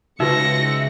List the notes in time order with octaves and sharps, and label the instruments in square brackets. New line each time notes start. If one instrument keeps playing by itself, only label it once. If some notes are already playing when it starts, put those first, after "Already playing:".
[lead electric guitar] C#2 [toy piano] D#4 F#4 B4 [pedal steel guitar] E5 [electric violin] A#6 C#7